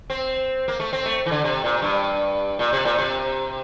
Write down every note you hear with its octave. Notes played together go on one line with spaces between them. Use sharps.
C4
A#3
A3
C4
A3
E3
D3
C3
A#2
G2
A#2
C3
A#2
C3